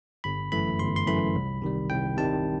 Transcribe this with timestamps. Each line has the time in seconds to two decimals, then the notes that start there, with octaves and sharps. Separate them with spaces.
0.24 G1 B5
0.52 F#2 E3 A3 B5
0.79 G1 C6
0.96 C6
1.07 F#2 E3 A3 B5
1.35 C2
1.62 C3 D#3 G3
1.90 C2 G5
2.17 C3 D#3 G3 A5